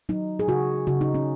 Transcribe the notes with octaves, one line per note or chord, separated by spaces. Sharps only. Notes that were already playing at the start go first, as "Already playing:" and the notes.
F#3 D#4
G#4
C#3 F#4
C#3 F#4
D#4
C#4